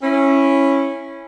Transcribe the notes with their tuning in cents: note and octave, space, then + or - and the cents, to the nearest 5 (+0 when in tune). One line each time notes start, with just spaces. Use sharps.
C#4 -15 E4 +0